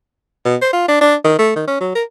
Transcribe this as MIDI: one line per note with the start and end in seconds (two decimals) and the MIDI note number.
0.45 0.56 47
0.62 0.73 72
0.73 0.88 65
0.88 1.00 62
1.01 1.15 62
1.24 1.35 51
1.38 1.55 57
1.56 1.65 51
1.67 1.80 61
1.80 1.92 54
1.95 2.04 70